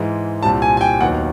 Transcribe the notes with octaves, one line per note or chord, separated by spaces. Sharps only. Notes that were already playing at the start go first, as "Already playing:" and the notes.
Already playing: G#2 E3 G#3
C2 A#2 G3 C4 A5
G#5
G#5
G5
D#2 D#3 F#3 B3 F#5